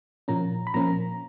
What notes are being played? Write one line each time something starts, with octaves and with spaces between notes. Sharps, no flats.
A#2 F3 A#3 C#4 A#5
B5
A#2 F3 A#3 C#4 A#5